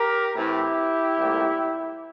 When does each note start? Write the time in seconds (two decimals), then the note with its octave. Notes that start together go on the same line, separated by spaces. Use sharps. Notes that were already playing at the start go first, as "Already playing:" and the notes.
Already playing: G4 A#4
0.36 A2 E3 A3 C4 E4 G4
1.18 C2 A#2 A3